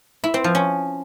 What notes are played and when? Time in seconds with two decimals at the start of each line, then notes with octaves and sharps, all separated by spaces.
0.24 E4
0.34 C4
0.44 F3
0.55 C#4